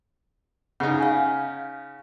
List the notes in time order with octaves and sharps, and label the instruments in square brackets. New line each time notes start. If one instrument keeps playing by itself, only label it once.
[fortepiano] C#3 D#4 [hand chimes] F#5
[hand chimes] F5 G#5